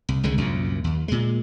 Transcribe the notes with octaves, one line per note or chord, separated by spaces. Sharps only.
C2
C2 D3 G#3
C2 F#2 A#2
D#2
A#2 G#3